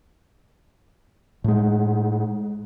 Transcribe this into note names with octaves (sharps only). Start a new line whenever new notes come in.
A2 G#3